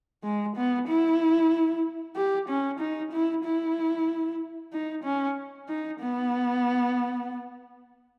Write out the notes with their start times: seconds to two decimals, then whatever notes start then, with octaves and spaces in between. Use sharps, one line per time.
0.24 G#3
0.56 B3
0.88 E4
2.16 G4
2.49 C#4
2.79 D#4
3.12 E4
3.44 E4
4.72 D#4
5.04 C#4
5.68 D#4
6.00 B3